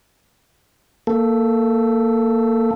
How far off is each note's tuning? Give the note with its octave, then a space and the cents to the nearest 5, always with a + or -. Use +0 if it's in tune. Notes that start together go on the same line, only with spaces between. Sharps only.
A#3 -10 A4 +0